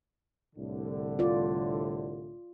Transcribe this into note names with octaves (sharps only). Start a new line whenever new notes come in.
C2 A2 D3
F4 D5